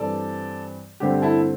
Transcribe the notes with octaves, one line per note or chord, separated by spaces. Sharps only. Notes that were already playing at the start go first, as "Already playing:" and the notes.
Already playing: G2 E3 C4 A4 D5
G2 D3 A3 C4 G4
E4 A4